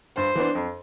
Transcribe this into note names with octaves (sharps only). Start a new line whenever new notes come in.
G2 C5
E3 B3 D4
F2